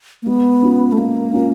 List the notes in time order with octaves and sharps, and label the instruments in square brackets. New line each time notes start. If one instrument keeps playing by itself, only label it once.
[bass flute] A#3
[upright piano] G#3 [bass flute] B3
[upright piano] C#4 F4
[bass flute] A3
[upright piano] G#3 [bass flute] A#3
[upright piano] C#4 F4